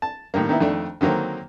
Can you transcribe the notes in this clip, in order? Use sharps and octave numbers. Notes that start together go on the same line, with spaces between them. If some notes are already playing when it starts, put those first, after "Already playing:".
A5
A2 D#3 G3 A#3
D#3 A#3 B3 E4
F2 D#3 A3 D4
D3 D#3 F#3 A#3 C4